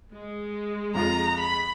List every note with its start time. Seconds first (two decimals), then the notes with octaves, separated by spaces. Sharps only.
0.13 G#3
0.95 F2 F4 A#5
1.39 B5